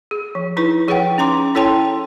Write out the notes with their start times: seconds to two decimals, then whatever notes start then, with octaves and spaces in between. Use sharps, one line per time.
0.11 G#4
0.35 F3
0.57 D#4 E4 B4 C#6
0.88 F3 G#4 B4 C#5 F#5 G5
1.18 C#4 D#4 A#5 C6 D6
1.55 E4 A4 C#5 G5 A5 C6